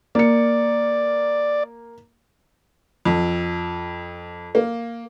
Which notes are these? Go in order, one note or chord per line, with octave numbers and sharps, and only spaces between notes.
A#3 D5 C#7
F2
A#3